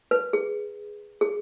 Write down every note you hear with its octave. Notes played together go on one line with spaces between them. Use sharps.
B4
G#4
G#4